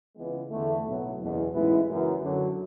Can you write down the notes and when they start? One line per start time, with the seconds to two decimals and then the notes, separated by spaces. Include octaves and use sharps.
0.16 C#2 C#3 E3 G#3 B3
0.50 E2 D3 A3
0.84 B1 A2 F#3 B3
1.19 F#1 E2 B2
1.52 A1 G#2 G#3 B3 E4
1.87 F#1 F#2 E3
2.22 F#2 D3 F#3